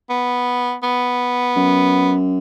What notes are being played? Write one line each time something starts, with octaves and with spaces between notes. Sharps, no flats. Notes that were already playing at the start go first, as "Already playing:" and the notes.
B3
B3
F#2